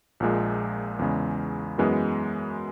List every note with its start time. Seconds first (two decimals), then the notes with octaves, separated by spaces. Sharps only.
0.20 A#1 A#2 G#3
0.99 E2 C#3 G#3
1.78 F#2 E3 G#3 B3